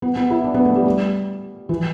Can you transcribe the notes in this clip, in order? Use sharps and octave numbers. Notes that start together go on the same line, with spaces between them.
B3
B3
E4
D4
B3
A3
G3
G3
E3